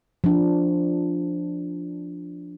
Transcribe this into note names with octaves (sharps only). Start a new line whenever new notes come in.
F3 D4